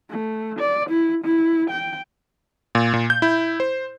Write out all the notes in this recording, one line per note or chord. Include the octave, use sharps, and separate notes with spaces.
A3
D5
E4
E4
G5
A#2
A#2
G6
E4
C5